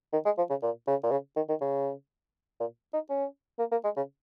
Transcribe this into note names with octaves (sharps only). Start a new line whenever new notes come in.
D#3
G#3
F3
C#3
A#2
C#3
A#2
C#3
D#3
D#3
C#3
A#2
D#4
C#4
A#3
A#3
G#3
C#3